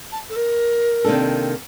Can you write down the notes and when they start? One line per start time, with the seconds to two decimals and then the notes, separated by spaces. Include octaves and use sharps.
0.12 A5
0.29 A4
0.36 A#4
1.04 C3 D#3 A#3 D4 A4